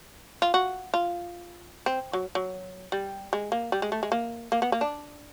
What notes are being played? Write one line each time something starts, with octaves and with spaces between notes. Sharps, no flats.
F4
F#4
F4
C4
F#3
F#3
G3
G#3
A#3
G3
G#3
A3
G#3
A#3
A#3
B3
A#3
D4